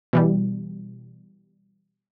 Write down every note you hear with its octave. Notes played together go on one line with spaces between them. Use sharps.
B2 E3 G3